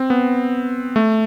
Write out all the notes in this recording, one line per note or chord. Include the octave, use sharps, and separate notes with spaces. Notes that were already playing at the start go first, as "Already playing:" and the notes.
Already playing: C4
B3
A3